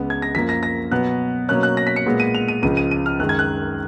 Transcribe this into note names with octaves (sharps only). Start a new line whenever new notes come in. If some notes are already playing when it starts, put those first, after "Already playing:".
Already playing: C#2 C#3 G#3 B3
G#6
A#6
F#2 F3 A#3 B6
A#6
A#6
B2 F#3 B3 F#6
B2 F#3 A#3 C#4 F#6
F#6
A#6
B6
C#7
A#2 G#3 B3
D#7
F7
D#7
C#2 C#3 F3 D#7
D#7
D#7
F6
F#2 D#3 G#3 F#6
G#6
F#6